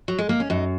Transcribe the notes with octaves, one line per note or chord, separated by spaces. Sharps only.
F#3
G#3
A#3
C#4
F#2 D#4